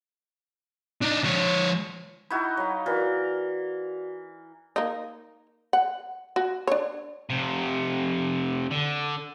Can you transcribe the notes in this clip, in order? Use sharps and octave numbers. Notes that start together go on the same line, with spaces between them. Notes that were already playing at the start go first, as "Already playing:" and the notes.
D4 D#4
F3 C#5
D#4 E4 F#4 B5
F#3 F5
E3 F#4 A#4 D5 B6
A#3 D#4
F#5
F#4
D4 C#5
F2 C3
D3